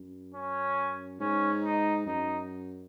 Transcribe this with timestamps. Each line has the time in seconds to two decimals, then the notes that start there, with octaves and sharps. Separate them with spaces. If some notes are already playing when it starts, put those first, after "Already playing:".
Already playing: F#2
0.34 C#4
1.20 G#2 C#4
1.64 D#4
2.06 F#2 D#4